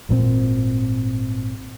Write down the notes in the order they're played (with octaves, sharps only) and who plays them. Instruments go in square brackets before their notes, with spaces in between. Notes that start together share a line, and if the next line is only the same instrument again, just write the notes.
[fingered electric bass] G#1 A#2 D#3 C4